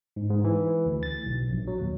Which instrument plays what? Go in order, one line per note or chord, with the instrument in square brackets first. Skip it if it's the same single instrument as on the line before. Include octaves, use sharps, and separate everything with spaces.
[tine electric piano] G#2
G#2
E3
D2
A6
B1
A#1
F#3
D#2